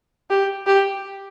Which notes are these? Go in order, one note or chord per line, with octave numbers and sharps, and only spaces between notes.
G4
G4